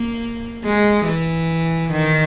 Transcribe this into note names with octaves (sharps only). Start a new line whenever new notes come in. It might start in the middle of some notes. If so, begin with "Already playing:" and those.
Already playing: A#3
G#3
E3
D#3